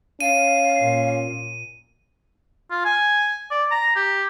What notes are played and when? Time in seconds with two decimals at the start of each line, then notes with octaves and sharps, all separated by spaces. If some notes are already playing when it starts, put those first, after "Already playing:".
0.20 C#4 F5 D#7
0.81 A#2
2.71 F4
2.85 G#5
3.51 D5
3.71 A#5
3.96 G4